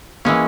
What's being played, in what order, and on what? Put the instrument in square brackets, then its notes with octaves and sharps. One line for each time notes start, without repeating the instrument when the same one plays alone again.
[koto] E3 G#3 C#4 [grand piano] A#3